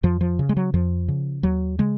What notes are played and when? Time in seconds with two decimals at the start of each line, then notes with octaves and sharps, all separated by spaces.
0.03 F2 F3
0.21 F3
0.39 C#3
0.49 G#3
0.57 F#3
0.74 F2 F3
1.08 C#3
1.43 D#2 F#3
1.79 C#3 G#3